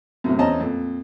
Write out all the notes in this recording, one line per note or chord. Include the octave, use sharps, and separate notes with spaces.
F#2 A2 C3
E2 C4 C#4 D#5 A5 A#5
F2 A#2